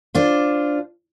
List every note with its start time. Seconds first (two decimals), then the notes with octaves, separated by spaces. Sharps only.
0.15 D4 F4 C5